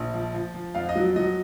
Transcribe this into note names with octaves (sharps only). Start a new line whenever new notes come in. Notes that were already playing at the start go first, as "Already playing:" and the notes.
Already playing: A#1
F3
F3
F3
F2 F5
D#5
F#3
F#3 D#5